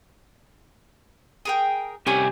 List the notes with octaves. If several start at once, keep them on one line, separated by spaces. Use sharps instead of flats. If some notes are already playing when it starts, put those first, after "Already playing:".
G#4 A#4 G5
C2 C#4 G4 G#5 B5 C#6